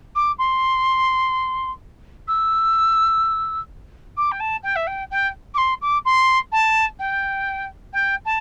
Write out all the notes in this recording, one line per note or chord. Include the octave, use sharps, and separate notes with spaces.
D6
C6
E6
D6
G5
A5
G5
E5
G5
G5
D6
C6
D6
C6
A5
G5
G5
A5